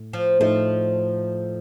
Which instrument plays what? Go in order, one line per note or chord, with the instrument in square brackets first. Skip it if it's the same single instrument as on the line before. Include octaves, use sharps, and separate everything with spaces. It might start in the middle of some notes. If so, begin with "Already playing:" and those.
Already playing: [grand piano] A2
[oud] F3
[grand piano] A2 A3 D#4 [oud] F3